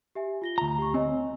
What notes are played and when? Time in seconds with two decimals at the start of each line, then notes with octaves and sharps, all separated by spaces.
0.15 G4 E5 G#5
0.42 F4 A#6 G7
0.58 D2 A#5
0.78 G4 C#6
0.94 C4 C#5 D#5 G#5